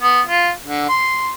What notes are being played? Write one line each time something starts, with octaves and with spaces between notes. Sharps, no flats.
B3
F4
D3
C6